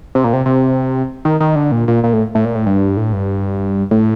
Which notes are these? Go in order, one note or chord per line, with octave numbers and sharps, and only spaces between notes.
C3
A#2
C3
C3
D#3
D#3
D3
A#2
A#2
A#2
A2
A2
A#2
A2
G2
A2
G2
A2